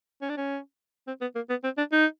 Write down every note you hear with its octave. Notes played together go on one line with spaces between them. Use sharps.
C#4
D4
C#4
C4
B3
A#3
B3
C4
D4
D#4